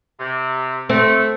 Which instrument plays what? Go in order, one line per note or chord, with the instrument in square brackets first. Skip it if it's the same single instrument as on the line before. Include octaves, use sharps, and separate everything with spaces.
[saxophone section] C3
[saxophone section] A3 [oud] C4